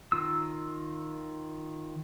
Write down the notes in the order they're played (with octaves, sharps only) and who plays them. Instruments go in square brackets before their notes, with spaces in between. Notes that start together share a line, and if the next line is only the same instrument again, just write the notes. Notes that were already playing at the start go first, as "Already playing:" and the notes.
[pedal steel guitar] D#3 F4 E6